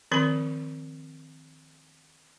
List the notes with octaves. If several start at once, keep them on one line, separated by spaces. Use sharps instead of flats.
D#3 F3 C4 A#4 C6